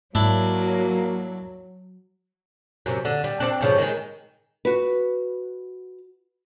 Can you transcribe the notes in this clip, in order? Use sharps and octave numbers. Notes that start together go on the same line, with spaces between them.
G#2 F#3 A#3 D4 E4
F#2 C3
D3
G3
C4 D4
G2 C#3 F3
D#3 G#3
F#4 B4